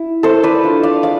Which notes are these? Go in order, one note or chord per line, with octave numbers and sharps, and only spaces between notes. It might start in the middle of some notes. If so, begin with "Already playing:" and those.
Already playing: E4
A3 A4 C5
B4 D5
D4 F4
D5 F5
G#3 D5 F5